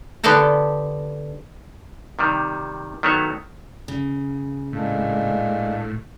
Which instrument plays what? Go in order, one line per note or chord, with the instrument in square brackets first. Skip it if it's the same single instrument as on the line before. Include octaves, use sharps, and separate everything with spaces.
[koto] D3 B3 D4 G4 A4 A#5
[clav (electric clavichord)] C3 D#3 G3
D#3 F#3 A3 B3 F#4 C#5
[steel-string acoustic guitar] C#3
[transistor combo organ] A2 [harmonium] G#3 A#3 D4